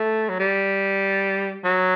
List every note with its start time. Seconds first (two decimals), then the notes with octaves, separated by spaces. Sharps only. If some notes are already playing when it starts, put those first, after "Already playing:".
Already playing: A3
0.29 F#3
0.39 G3
1.64 F#3